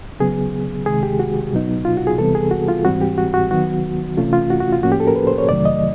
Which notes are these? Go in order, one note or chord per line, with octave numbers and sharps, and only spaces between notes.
C#3 F#3 B3 G#4
C3 D#3 G#3 G#4
G4
F#4
B2 F#3 B3 D#4
F4
F#4
G#4
C3 E3 G3 B3 A4
G#4
F#4
F4
G#2 E3 G3 C4 F#4
G4
F#4
F#4
D#3 F#3 B3 F#4
C3 E3 A3 C#4 F4
F4
F#4
F#4
F4
A2 F3 A#3 C#4 F#4
G4
A4
A#4
B4
C5
C#5
F2 C3 D#3 F#3 A3 D5
D#5